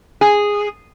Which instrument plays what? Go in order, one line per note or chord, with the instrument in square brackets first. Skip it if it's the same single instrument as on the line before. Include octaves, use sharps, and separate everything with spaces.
[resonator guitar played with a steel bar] G#4